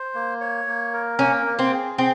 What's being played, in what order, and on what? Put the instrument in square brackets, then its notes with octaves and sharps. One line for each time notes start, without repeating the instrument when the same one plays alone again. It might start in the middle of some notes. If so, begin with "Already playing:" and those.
Already playing: [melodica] C5
A#3
C#5
A#3
A#4
[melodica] A#3 [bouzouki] C#4
[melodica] A#3
[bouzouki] C4
[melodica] G#4
[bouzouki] C4 [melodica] G#4